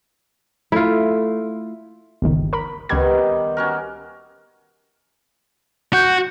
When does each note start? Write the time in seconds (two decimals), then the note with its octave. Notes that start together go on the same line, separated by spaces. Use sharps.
0.72 A3 E4 F4
2.22 G1 C#2 D#3
2.53 A#4 B5
2.89 C#2 D#3 G3 B3 G#6
3.57 C#4 F#4 A#4
5.93 F#4 G6